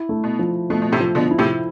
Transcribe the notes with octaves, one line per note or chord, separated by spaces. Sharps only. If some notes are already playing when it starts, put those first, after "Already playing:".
Already playing: E4
A3
B2
F3
B2 A3
B2
A2 C3
F3
B2 D3
E4
A2 C3